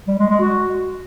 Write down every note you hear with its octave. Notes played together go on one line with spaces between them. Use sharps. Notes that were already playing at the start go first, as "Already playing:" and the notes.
G3
G#3
G#3
F#4